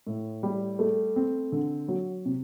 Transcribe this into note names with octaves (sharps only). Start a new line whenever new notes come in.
A2
G3
A3
C4
D3
F#3
C3